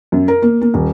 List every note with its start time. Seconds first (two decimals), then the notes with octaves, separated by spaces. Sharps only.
0.12 F#2
0.28 A#4
0.42 A#3
0.61 A#3
0.74 D#1